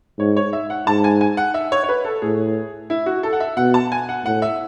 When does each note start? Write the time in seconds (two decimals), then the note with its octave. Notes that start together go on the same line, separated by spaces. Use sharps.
0.19 G#2 C#5
0.37 C#5
0.53 E5
0.70 F#5
0.87 G#2 A5
1.04 G#5
1.21 G#5
1.37 F#5
1.54 E5
1.72 C#5
1.83 C#5
1.89 B4
2.05 A4
2.22 A2 G#4
2.90 E4
3.06 F#4
3.23 A4
3.33 F#5
3.40 E5
3.57 B2 F#5
3.74 A5
3.92 G#5
4.09 F#5
4.25 A2 F#5
4.42 E5